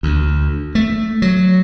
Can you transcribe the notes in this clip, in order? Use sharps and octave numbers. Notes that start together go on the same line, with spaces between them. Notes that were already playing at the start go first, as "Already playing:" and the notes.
D2
A3
F#3